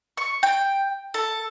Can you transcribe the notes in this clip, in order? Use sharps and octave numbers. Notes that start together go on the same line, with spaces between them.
C#6
G5
A4